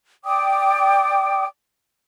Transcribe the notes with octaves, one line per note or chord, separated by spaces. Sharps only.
D5 G5 D6 D#6